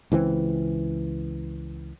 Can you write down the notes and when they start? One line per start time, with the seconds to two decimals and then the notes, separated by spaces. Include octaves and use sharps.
0.12 C#2 E3 G#3 C4